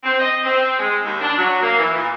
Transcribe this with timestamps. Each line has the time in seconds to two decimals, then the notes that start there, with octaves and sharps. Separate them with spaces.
0.04 C4
0.19 D#5
0.43 C4
0.78 G#3
1.03 D#2
1.21 D4
1.36 F#3
1.61 A#3
1.78 E3
1.94 A#2